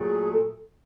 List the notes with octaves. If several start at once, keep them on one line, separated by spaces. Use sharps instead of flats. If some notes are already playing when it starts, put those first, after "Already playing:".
Already playing: A#2 F#3 A3 G#4
A4